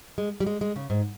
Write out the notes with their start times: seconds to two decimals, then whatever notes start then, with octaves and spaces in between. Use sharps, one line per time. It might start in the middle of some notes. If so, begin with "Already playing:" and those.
0.18 G#3
0.40 G3
0.46 G#3
0.61 G#3
0.76 C#3
0.90 G#2